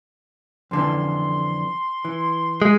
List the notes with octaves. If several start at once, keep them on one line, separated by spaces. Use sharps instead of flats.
F2 D3 E3 C6
E3
G#3 G#5